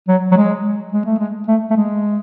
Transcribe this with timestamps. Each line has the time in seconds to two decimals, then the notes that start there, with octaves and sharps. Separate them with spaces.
0.08 F#3
0.32 F#3
0.37 G#3
0.93 G#3
1.06 A3
1.19 G#3
1.48 A3
1.71 A3
1.76 G#3